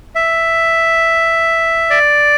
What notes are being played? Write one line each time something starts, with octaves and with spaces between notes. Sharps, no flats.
E5
D5